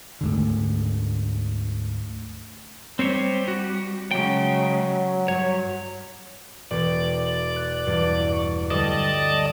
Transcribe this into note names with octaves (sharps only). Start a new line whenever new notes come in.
D2 G#2 D3
G3 C4 C5 C#5
F#4
C#3 F#3 G#3 G5
G2 F#3 C#5
E1 D5
F#6
E2 G2
C#6
D2 G3 D5 D#5 A5